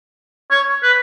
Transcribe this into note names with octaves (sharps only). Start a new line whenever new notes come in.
C#5
B4